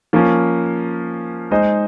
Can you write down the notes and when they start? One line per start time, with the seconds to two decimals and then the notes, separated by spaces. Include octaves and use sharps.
0.13 F3 A#3 C#4
1.51 G#3 D#4 G#4 C5 D#5